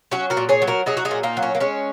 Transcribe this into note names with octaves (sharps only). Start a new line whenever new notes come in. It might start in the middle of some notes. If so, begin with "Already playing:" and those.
F#3 C#4 F#4
F#4 A#4
A#2
G#4 C#5
F#3
F#4 A#4
F#3 D#4 G#4
F#4
D#4 G#4
A#2
A#3 D#4
F#3
C#4
A#3
G#3 C#4